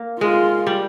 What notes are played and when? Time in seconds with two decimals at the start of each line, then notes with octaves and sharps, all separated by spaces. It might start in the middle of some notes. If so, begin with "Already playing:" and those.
Already playing: A#3
0.20 G#3 F4
0.67 G3